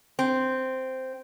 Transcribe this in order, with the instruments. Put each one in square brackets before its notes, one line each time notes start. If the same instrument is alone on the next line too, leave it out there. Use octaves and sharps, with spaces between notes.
[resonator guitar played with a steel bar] C4